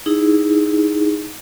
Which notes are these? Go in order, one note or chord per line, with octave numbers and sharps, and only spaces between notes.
D#4 E4 G#4